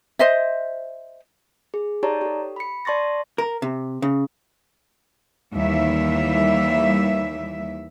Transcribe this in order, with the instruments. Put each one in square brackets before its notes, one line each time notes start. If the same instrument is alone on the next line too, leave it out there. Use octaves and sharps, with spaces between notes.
[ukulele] C5 D#5 E5
[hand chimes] G#4
D#4 G4 C#5 D5 A5 A#5
G4 A4
B5 C#7
D5 A5 C6 C#6 A6 A#6
[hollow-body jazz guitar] A#4
C3
C#3
[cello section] D#2 E3 G3 E5